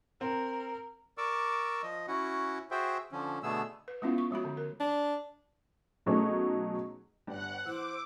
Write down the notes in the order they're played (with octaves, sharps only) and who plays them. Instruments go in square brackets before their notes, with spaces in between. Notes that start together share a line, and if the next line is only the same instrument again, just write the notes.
[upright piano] C4 [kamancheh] A#4
[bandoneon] A#4 D5 C#6 D6 E6
F3 D#5
C#4 E4 F#4 F#5
F#4 G#4 C5 E5 G5
D3 F3 C#4
B2 D3 A3 B3 G#4 E6
[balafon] B4
G#3 B3 C#4 E4 F4 F5
C#6
F3 G#3 F#4 B5
D3
A#4
[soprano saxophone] D4
[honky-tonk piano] B2 F#3 A3 C#4 D#4 G#4
[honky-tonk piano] G1 D4 G4 [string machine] F#5 F#6
[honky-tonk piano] E3 [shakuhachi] C5 [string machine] D6 [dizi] E6